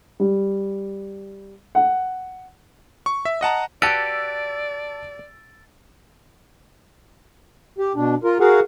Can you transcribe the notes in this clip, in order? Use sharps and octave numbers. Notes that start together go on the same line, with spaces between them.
G3
F#5
C#6
E5
D#5 F#5 A5 A#5
F#4 G4 B4 D5 A5 E6 A6 D7
G4
B2 D4
F4 A#4
F#4 G#4 A#4 F5 F#5